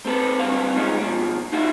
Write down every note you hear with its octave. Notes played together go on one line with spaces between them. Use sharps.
C4 A4 B4
G2 D3 C4 F5
D#3 F3 G#3 B3 C#4 D#4
B2 F3
D#4 F4 F#4 E5